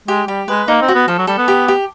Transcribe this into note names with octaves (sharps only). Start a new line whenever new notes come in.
G#3 G4
G3 G4
G#3 B4
A#3 D#4
C4
F#4
B3
F3 A4
F#3
G3 A4
B3
G4
G4